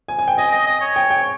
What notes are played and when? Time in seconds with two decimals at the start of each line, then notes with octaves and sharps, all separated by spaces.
0.08 G#5
0.19 G#5
0.28 G5
0.38 D#5 G#5
0.52 D#5
0.67 D#5
0.81 C#5
0.96 G5
1.10 G5